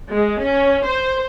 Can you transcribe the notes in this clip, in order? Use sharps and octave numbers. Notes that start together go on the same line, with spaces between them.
G#3
C#4
C5